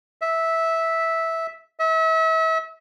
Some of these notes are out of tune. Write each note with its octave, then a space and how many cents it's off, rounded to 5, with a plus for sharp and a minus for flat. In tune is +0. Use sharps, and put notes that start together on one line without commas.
E5 -10
E5 -35